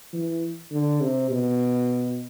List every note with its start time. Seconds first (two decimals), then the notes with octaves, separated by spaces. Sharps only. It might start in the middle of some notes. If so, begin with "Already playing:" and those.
0.13 E3
0.71 D3
1.01 C3
1.31 B2